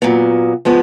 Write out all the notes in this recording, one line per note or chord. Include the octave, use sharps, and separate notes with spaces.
A#2 F#3 B3
F3 G#3 B3